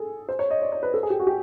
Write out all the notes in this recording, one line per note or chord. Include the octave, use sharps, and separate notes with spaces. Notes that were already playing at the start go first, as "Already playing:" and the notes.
Already playing: G#4 A4
C5
C#5
D#5
D5
C#5
B4
A4
G#4
G4
F#4
G4